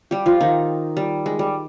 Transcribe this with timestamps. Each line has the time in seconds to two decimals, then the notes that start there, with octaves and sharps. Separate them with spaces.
0.11 G3 G4
0.26 F3 F4
0.40 D#3 D#4
0.97 G3
1.26 G#3
1.39 G3